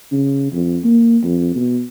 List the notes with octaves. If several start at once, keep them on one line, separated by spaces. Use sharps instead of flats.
C#3
F2
A#3
F2
B2